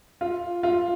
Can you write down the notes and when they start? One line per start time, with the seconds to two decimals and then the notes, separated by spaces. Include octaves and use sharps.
0.21 F4
0.63 F4